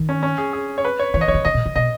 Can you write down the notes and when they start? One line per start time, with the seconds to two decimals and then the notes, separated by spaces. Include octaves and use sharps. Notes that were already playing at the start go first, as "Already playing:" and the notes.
Already playing: D#3
0.09 C#4
0.23 C#4
0.38 G#4
0.53 G#4
0.78 C#5
0.85 B4
0.99 C#5
1.14 E3 C#5
1.21 D#5
1.28 D#3 C#5
1.34 C#3
1.45 C#3 D#5
1.54 B2
1.66 C#3
1.76 B2 D#5